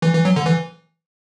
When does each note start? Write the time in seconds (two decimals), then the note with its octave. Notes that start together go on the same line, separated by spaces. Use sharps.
0.02 E3
0.14 E3
0.25 F#3
0.36 D3
0.47 E3